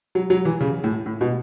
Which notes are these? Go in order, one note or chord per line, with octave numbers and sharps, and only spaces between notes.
F#3
F#3
E3
C#3
A2
A2
B2